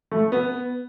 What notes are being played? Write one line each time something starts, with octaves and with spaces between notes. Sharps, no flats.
A3
B3